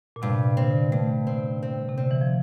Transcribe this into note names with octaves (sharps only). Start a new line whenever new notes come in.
A#2
G2 C3
D3 C4
G2 A3
C4
C4
C3
D3 C4
E3
F3